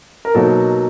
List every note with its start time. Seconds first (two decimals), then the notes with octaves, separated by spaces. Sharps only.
0.25 A#4
0.35 B2 F#3 A#3 D#4 A4